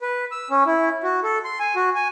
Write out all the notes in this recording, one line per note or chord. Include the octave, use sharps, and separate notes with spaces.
B4
E6
C#4
E4
F#4
A4
C6
G#5
F#4
G#5